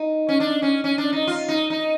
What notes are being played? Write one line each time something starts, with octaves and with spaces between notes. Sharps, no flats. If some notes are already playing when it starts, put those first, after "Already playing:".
Already playing: D#4
C#4
D4
C#4
C#4
D4
D#4
F4
D#4
D#4